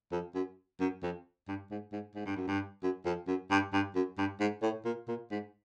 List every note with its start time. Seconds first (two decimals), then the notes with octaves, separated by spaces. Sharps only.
0.12 F2
0.35 F#2
0.80 F#2
1.03 F2
1.48 G2
1.71 G#2
1.92 G#2
2.15 G#2
2.25 G2
2.37 F#2
2.47 G2
2.83 F#2
3.05 F2
3.27 F#2
3.51 G2
3.73 G2
3.95 F#2
4.18 G2
4.40 G#2
4.62 A2
4.85 A#2
5.08 A#2
5.31 G#2